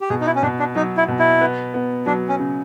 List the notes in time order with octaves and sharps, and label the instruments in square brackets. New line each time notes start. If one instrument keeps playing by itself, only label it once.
[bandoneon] G4
[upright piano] B2 [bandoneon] G#4
[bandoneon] D#4
E4
C#4
[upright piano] B2 [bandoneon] D4
[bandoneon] D4
[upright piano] F#3 [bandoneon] D#4
[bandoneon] E4
[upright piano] B2
[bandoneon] E4
[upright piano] B3
B3
[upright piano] F#3 [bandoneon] D4
[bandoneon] C#4
[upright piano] C#3